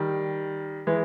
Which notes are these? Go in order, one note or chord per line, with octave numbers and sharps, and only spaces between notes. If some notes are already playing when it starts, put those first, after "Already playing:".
Already playing: D#3 G3
E3 G#3